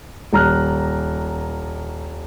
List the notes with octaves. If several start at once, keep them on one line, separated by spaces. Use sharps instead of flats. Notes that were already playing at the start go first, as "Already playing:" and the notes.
D#1 A#5 F6 F#6